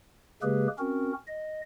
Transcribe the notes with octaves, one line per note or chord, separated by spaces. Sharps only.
C#3 G#3 A#3 G4 G#4 B4
C4 C#4 F#4 A#4
D#5